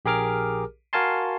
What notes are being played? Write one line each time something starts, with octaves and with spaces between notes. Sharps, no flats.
A#1 G4 G#4 A#4 D6 F6
F#4 A#4 F5 G#5 A5 C6